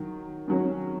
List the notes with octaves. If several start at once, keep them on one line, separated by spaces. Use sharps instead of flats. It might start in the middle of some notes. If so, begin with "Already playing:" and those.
Already playing: D#3 F#3
D#3 F#3 C#4